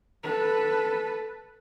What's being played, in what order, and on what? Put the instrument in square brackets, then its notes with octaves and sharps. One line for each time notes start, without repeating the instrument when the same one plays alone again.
[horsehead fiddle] A4 B4